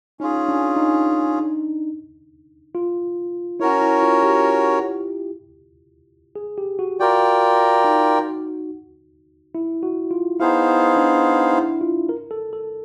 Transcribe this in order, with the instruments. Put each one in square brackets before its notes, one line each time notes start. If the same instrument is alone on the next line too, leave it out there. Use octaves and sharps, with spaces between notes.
[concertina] C#4 F4 G#4 [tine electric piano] D#4
[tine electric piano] D4
D#4
F4
[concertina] C#4 F#4 A#4 C#5 [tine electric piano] E4
[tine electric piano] E4
F4
G4
G#4
G4
F#4
[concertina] F4 A#4 D5 G5 [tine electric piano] F#4
[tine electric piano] D#4
E4
F#4
F4
[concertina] B3 D#4 G#4 C5 F5 [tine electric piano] E4
[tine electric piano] D4
E4
F4
A#4
A4
A4